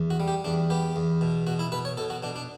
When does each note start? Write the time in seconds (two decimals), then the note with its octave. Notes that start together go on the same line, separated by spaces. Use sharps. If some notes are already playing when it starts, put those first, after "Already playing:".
Already playing: E2
0.10 F#4
0.20 G3
0.28 G4
0.45 E2 D4
0.70 B3 G4
0.96 E2
1.21 B2
1.47 B2 F#4
1.59 E4
1.72 B2 B4
1.85 C#5
1.97 B2 A4
2.10 F#4
2.23 B2 D4
2.36 D4